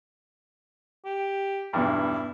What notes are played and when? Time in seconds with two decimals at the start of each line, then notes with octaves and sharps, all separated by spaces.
1.05 G4
1.73 B1 E2 G2 E4